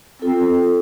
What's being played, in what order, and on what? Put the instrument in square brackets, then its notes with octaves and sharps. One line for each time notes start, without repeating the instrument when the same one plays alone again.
[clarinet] C4 [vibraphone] F4 A4